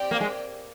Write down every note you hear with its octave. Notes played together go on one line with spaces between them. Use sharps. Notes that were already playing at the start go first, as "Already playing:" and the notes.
Already playing: C4 G4 D5 G5
A#3
G#3